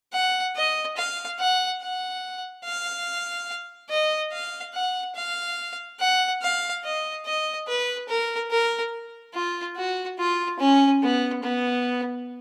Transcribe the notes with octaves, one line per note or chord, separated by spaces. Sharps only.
F#5
D#5
F5
F#5
F#5
F5
D#5
F5
F#5
F5
F#5
F5
D#5
D#5
B4
A#4
A#4
F4
F#4
F4
C#4
B3
B3